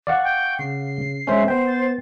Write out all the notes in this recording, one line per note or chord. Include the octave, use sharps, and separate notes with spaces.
D5 F5 F#5 C#6
G5
C#3 C7
G#3 C#4 C5 E5
B3 C5 G5
A6